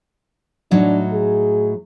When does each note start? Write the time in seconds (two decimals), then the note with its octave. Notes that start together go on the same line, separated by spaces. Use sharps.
0.71 A2 F#3 D4 D#4
1.13 G#4